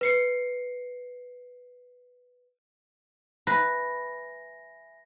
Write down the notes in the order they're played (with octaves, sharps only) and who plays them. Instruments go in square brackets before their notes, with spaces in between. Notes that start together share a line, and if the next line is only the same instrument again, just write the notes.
[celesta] B4 C7 C#7
[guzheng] B4 [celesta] E5 G#5 A#6